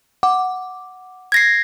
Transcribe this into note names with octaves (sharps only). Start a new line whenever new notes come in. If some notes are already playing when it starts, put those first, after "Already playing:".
F#5 D6
G#6 A#6 C7